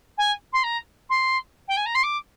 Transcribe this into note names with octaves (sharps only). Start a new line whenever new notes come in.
G#5
C6
A#5
C6
G5
G#5
A#5
C6
D6